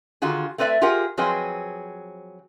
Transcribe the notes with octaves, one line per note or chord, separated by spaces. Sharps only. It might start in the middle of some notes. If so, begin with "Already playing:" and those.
D3 D#3 F4 F#4 G#4
A3 C4 B4 D5 E5
F4 G4 G#4 A#4 F#5
F3 F#3 C4 G#4 B4 D#5